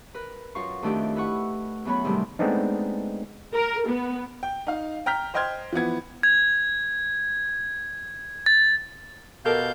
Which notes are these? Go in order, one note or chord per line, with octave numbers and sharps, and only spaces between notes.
A#4 B4
F#2 F4 F5 C#6
F2 D#3 A3 D4 G4 D5
E4 B4 F#5 C#6
E2 F#3 B3 C#4 C#5 B5
G#2 C3 D#3 F#3 G3 A3
G#3 A3 B3 C4 D4 D#4
A#4
B3
G5
D#4 F5
G5 A#5 F6 G6 B6
C5 D#5 G5 C6 F6 G#6
E3 F3 B3 G#6
G#6
A6
B2 G4 A4 A#4 F5 G6